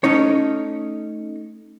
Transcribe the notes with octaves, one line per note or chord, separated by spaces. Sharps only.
A3 C#4 D#4 C#5